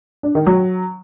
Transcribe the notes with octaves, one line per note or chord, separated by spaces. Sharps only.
D4
D#3
F#3